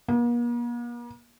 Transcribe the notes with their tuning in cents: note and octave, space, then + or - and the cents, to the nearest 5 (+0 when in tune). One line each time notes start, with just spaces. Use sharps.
A#3 +45